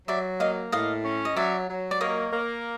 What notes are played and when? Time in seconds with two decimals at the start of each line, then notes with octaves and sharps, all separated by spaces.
0.08 F#3 D5 E5
0.40 A#3 D#5 F5
0.72 A2 D#5 F5
1.04 C#4
1.25 D#5
1.36 F#3 D5 E5
1.69 F#3
1.91 D5
2.00 A#3 C#5 D#5
2.33 A#3